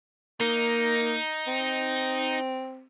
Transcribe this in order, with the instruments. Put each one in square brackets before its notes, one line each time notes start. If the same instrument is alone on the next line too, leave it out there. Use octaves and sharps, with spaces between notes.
[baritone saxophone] A#3 [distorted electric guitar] D#4
[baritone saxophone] C4